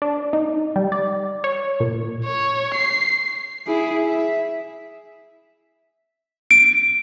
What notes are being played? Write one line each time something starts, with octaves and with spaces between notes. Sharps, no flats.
D4
D#4
G3
D5
C#5
A#2
C#5
C7
E4 G#4
E5
D7